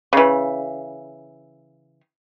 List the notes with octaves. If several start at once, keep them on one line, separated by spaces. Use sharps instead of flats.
C#3 E3